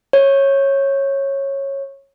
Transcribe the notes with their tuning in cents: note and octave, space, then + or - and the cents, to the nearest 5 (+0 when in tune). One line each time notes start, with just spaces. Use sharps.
C#5 -15